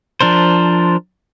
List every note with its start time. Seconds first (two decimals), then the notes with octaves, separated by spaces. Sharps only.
0.21 F3 D4 A#4 C5